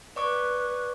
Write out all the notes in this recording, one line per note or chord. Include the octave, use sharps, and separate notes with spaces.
B4 D5 C#6 D6